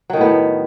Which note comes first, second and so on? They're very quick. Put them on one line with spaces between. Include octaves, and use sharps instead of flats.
F#3 D#3 A2 B3